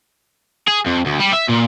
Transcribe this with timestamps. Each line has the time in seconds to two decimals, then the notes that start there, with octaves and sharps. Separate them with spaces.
0.68 G#4
0.86 F2
1.06 D2
1.20 G3
1.33 E5
1.48 A#2